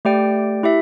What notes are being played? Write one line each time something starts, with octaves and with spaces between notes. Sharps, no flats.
A3 G4 D5 G5
E4 G4 E5